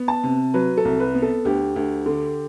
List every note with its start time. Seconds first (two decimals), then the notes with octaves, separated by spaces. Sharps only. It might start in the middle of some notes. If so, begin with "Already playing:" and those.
Already playing: B3
0.08 A5
0.24 C3
0.54 F#3 B4
0.77 A4
0.85 C2
1.00 B4
1.15 B3
1.22 A4
1.45 D2 G4
1.76 D2
2.06 D3